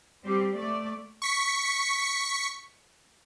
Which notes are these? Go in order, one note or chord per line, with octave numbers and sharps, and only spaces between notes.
G3 C4 G4
A3 D5
C#6 B6 C#7